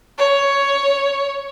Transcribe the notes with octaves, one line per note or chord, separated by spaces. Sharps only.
C#5